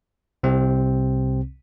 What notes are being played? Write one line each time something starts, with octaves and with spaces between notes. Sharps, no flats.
C2 C3 C4